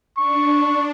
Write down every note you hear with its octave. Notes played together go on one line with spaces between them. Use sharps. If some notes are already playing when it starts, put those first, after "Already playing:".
D4 C#6